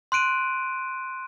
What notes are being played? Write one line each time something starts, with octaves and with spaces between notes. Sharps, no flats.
C6 F#6 D7 D#7